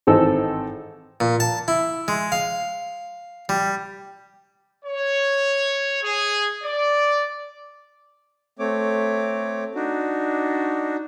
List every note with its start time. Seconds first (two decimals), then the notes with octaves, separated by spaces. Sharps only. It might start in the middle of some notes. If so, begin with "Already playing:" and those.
0.07 G#1 E3 C4 D#4 A4 E6
1.20 A#2
1.40 A5
1.68 E4
2.08 G#3
2.32 F5
3.49 G3
4.85 C#5
6.03 G#4
6.63 D5
8.59 A3 C4 C#5 D6
9.75 D4 D#4 F#4